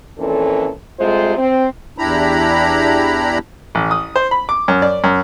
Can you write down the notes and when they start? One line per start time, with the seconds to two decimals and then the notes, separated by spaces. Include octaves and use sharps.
0.19 F2 A#2 E3 C#4 A4
1.00 C3 G3 G#3 F4 A4 C5
1.38 C4
1.98 E2 D4 E4 G4 A#5 B5
3.75 A1
3.91 D#6
4.16 C5
4.31 B5
4.49 D6
4.68 F#2
4.82 D5
5.04 F#2